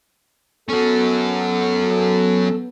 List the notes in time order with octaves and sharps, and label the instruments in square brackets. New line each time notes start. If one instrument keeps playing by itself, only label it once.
[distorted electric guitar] F#3 C#4 [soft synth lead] B3 [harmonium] A4